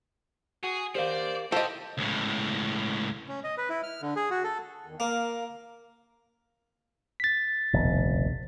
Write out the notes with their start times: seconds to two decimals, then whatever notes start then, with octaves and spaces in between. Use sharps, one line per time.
0.63 F#4 G#4
0.95 G4 A#4 C5 D5 F5
1.52 C4 F4 G4 A4 C5 D#5
1.98 C#2 A2
3.28 C#4
3.44 D#5
3.58 B4
3.69 E4
3.83 F6
4.02 D3
4.16 G#4
4.30 F#4
4.44 A4
4.86 E2 D#3
5.00 A#3 A#4 F5
7.20 A6 B6
7.73 F1 A#1 D#2 B2